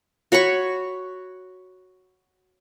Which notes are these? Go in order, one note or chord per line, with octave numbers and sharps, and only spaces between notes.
F#4 C#5 B5 C#6